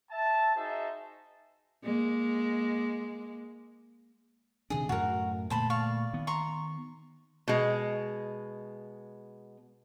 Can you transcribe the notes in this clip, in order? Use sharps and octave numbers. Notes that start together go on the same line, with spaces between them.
E5 A5
D#4 F#4 G#4 C5 E5 A5
G#3 A#3
C3 D#3 D4 G#4 D#5
F#2 A2 F#4 A#4
A#2 D3 A3 C5 A5 B5
D5 F5 C#6
D#3 B3
A#5 C6 C#6
B2 G#3